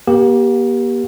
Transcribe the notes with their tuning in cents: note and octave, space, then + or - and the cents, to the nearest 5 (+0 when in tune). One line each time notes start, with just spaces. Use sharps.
A#3 +40 G4 +0